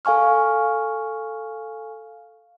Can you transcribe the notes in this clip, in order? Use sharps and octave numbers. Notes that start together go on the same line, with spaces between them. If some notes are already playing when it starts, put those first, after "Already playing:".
A4 F5 G#5 C#6 F6